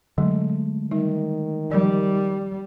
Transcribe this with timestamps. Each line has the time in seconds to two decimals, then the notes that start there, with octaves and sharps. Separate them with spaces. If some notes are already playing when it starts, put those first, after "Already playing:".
0.18 D3 F#3 G#3 A3
0.91 D#3 G3 D#4
1.72 F3 G3 A#4